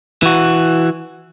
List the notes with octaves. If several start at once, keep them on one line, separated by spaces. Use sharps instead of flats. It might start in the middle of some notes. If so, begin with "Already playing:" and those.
E3 F#4